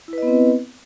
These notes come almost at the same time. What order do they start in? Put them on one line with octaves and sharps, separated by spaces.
E4 B4 D#5 B3 C4